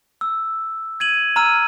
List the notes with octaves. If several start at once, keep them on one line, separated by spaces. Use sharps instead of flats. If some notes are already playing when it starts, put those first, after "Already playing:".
E6
G#6 D#7 F#7
A#5 E6 F6 D#7